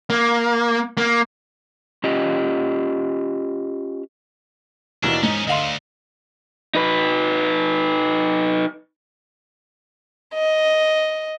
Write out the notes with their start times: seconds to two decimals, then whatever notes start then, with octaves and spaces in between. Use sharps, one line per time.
0.10 A#3
0.97 A#3
2.04 C#4 F4 G4 D#5
5.03 D#2 B2 E3 D4
5.23 G#2 C#4 D#4
5.47 D2 D3 D#5 F5 C6
6.75 D#4 B4
10.34 D#5